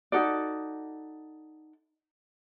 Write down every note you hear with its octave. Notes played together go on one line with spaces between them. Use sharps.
D#4 F#4 A4 D5